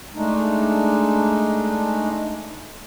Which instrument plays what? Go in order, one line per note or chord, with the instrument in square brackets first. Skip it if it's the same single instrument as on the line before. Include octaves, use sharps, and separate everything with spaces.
[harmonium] G#3 A3 D4 D#4